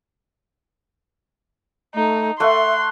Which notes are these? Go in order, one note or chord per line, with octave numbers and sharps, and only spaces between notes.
A3 D#4
A3 E5 F#5 C6 C#6